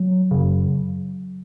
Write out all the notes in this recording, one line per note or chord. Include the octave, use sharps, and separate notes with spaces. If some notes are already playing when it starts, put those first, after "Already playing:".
Already playing: F#3
F#2 C#3